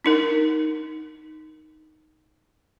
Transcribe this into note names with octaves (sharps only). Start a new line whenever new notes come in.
D4 D#4 A#4